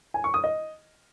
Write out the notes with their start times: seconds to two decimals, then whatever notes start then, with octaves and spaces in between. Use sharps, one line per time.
0.14 G#5
0.24 C#6
0.34 D#6
0.44 D#5